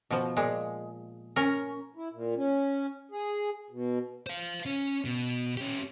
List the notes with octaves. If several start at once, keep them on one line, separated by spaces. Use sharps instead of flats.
B2 F3
A#2 G#3
C#4 A#4
E4
A#2
C#4
G#4
B2
C5 F5
C#4
B2
C#4 G4